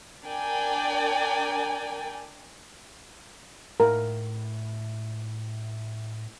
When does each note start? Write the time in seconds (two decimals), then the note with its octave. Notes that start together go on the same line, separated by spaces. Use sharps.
0.24 D4 A#4 D5 G5 G#5
3.80 A2 A#4